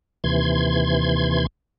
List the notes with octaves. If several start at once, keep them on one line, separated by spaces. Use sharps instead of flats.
D#2 C3 E3 C6 G#6